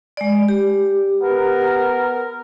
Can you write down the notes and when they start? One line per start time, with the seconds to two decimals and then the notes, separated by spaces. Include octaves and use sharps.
0.17 G#3 D5
0.48 G4
1.21 B3 A#4